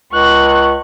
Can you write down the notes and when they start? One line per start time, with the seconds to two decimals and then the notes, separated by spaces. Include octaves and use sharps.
0.12 C#2 C#6 F#6